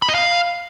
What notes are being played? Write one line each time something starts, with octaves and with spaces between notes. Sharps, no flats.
B5
D#5
F5